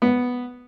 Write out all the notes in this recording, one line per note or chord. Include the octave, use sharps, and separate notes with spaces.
B3